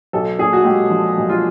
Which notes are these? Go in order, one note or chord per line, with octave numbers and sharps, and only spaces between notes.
B1 A4
A#2 G#4
F#4
G#3 G4
F3
B1
F4